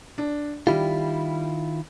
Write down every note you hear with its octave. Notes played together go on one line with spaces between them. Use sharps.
D4
D#3 G3 E4 F4